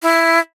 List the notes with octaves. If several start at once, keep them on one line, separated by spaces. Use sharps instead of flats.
E4